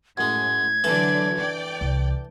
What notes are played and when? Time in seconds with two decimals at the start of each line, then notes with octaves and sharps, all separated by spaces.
0.17 F#2 A2 G#3 G#6
0.84 D3 E3 F#3 A4 D5 A5
1.36 D5 G5
1.81 C2